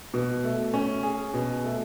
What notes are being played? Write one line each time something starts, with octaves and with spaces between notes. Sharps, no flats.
B2
A3
C#4
G#4
B2
A3